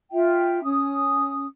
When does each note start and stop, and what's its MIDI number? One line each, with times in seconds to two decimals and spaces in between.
0.12 0.62 65
0.12 0.62 76
0.12 0.62 79
0.63 1.46 61
0.63 1.46 87